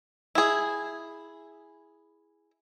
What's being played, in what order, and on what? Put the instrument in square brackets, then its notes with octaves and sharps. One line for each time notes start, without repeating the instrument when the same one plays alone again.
[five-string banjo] E4 G#4